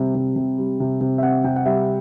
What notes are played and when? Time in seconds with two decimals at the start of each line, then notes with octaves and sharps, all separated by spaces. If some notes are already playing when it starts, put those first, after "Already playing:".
Already playing: C3 G3 C4
0.15 C3
0.36 C3
0.58 G3
0.80 C3
1.01 C3
1.18 E5
1.23 C4 F#5
1.44 C3 G5
1.56 F#5
1.65 G3 E5